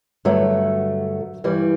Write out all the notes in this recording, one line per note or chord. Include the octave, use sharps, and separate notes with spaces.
G2 D3 F#3 A3
G2 E3 G3